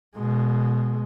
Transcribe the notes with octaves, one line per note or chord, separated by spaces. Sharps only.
B2 G#3